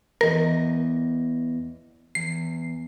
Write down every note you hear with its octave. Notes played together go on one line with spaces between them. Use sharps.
E2 A#4 D#5
E2 C7